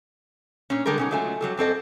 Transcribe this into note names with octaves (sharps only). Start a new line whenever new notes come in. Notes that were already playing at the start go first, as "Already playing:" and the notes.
A#2 C#4
D3 G3 G#3 A4 A#4
B2 C#4 D#4
F#3 G#3 A3 F4 G#5
F#3 G3 A4
F#2 C4 A4 D#5